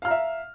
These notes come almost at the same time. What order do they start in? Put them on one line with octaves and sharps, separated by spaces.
F5 F6 A#5 E5